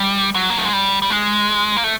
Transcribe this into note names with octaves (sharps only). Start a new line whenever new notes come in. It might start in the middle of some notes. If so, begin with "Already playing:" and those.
Already playing: G3
F#3
A#3
A3
G#3
G3
G3
G#3
A#3
A3